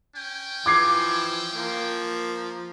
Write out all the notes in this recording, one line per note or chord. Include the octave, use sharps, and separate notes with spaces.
C#4 G5
E3 F3 D6 G#6 C7
F3 A#3